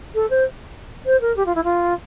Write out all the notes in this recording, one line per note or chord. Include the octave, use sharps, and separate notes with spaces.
A4
C5
C5
A#4
G4
F4
E4
F4